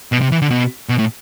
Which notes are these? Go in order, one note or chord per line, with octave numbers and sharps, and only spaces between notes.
B2
C3
E3
D3
B2
B2
A2